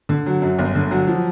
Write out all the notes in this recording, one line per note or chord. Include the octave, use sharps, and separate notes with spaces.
D3
F#3
F#2
G1
D3
F#3
F3